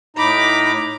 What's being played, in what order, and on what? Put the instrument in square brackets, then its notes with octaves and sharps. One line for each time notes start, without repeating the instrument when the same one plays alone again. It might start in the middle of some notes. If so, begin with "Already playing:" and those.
[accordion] A2 D#4 A#5 [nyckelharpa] B5 D6